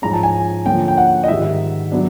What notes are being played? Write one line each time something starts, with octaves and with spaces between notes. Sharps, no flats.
G#2 F3 G#3 C#4 A#5
A5
G#5
D3 F3 A#3 C#4 G5
G5
F#5
D#5
G#2 D#3 G3 E5
F#3 B3 D4